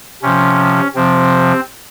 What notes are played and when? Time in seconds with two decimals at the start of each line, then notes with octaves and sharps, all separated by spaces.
0.22 C3 F3 C#4
0.95 C3 F3 C4